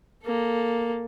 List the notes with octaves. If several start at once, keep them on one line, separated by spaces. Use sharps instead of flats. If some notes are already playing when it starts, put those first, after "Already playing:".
A#3 A4